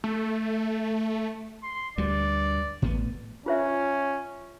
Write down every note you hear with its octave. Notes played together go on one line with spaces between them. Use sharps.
A3
C6
D2 G2 G3 D5
A1 A2 B3
C#4 F4 C5 E5